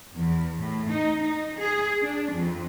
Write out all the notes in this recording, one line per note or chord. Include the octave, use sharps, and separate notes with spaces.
E2
A2
D#4
D#4
G#4
D4
F2